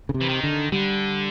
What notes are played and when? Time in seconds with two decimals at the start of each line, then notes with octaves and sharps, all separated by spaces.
0.09 C#3
0.14 C3
0.21 E3
0.29 D#3
0.43 D3
0.72 D3 G3